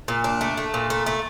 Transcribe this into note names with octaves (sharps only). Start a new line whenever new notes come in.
A#2
D4
A3
A3
A#2
A3
A3